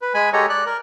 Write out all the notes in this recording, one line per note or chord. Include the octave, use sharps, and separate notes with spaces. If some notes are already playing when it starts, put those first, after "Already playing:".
B4
G#3 G#5 B5
G#3 G4 A4 C#5 A#5
D5 F#6
A#4